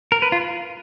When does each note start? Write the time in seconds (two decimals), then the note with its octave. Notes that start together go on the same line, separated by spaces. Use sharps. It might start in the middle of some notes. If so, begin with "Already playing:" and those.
0.12 A#4
0.22 B4
0.32 F4